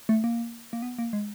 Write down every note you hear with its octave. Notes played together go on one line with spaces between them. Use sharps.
A3
A#3
A#3
B3
A#3
G#3